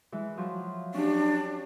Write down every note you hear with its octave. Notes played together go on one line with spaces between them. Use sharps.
E3 G#3
F3 F#3
C#4 D4 G4